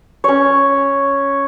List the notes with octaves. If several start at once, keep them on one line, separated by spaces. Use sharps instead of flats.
C#4 C#5